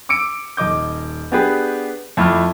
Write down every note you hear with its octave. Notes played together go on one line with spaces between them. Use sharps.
D6 E6 C#7 D7
D#1 D#5 D6 G6
B3 D4 G4 G#4 B4
F2 A3 E4 B5 D6 F6